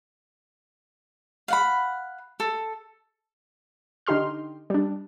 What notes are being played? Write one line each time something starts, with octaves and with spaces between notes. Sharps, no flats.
F5 F#5 B5
A4
D3 D#4 G4 C6 F6
G3 D4